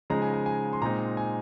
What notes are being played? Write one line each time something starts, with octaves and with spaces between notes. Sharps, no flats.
C#3 F3 G#3 D#4 A#5
G#5
G#5
G#5
C6
A#2 G#3 C4 D#4 A#5
G#5